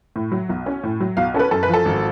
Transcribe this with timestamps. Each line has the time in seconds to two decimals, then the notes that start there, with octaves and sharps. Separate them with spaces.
0.16 A2
0.32 F#3
0.49 B1
0.66 C#4
0.84 A2
1.00 F#3
1.17 B1 F5
1.34 C#4 A4
1.39 B4
1.51 F#2 A4
1.63 B4
1.69 F3 A4
1.85 G#1